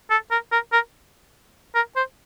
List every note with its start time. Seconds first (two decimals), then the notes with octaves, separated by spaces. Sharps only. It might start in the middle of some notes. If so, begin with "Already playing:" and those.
0.11 A4
0.31 A#4
0.52 A#4
0.73 A#4
1.75 A#4
1.96 C5